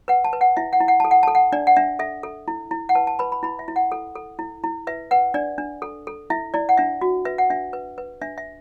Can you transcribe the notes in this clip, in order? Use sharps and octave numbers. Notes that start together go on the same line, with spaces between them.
B4 F#5
A5
B4
F#5
E4 E5
F#5
E4
F#5
A4 A5
F#5
A4 A5
F#5
D4 D5
F#5
D4 E5
A4 E5
A4
E4
E4
F#5
B4 A5
A5
B4 B5
B5
E4 B5
E5
E4
F#5
A4
A4
E4
E4
B4 E5
B4 F#5
D4 D5
D4
A4
A4
E4 E5
E4 D5
F#5
D4 E5
F#4
B4 E5
F#5
D4 E5
B4
B4
D4 E5
E5